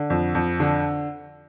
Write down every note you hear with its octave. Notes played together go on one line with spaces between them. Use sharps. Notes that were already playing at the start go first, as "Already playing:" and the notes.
Already playing: D3
F2
F2
D3